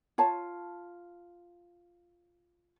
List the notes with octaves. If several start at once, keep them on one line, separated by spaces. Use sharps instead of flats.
F4 C#5 A5